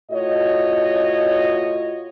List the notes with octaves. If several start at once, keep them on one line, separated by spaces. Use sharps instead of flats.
A2 F4 F#4 C#5 D#5